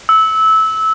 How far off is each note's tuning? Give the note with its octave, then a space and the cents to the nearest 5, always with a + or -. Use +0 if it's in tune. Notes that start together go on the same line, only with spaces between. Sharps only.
E6 -20